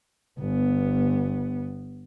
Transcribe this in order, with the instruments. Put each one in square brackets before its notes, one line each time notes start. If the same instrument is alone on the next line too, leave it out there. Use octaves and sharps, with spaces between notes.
[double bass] G1 B3